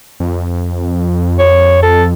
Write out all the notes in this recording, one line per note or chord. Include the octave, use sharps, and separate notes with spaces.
F2
C#5
A4